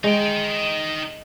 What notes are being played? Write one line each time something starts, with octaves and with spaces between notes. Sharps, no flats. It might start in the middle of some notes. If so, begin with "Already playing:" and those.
G#3 D#4 G5